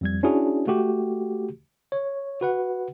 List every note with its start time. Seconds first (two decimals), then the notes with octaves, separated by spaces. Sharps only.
0.01 F2 G3 G#6
0.23 C#4 D4 E4 F#4 G#4
0.67 A3 F#4 G4
1.92 C#5
2.41 F#4 B4 F#5